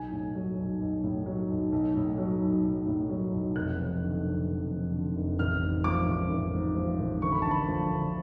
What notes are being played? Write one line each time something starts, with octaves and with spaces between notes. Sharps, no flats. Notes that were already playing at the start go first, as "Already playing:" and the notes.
Already playing: B1 G#5
A2
F#3
B1
B1
A2
F#3
B1
B1
A2
F#3
B1
B1
A2
F#3
B1
F1 F#6
F2
D3
F1
F1
F2
D3
F1
A1 F6
G#2
F3 D6
A1
A1
G#2
F3
A1
D2 C#6
B5
D3 A5
B5
F3
D2